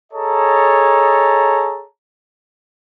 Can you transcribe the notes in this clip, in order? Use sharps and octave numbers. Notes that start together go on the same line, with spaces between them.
G#4 A4 C#5 D#5 A5 A#5